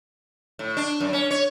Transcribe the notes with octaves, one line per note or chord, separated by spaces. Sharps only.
A2
D4
F#2
C#4
C#5